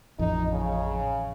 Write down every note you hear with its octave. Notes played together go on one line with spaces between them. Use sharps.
A1 F2 D#4
C#3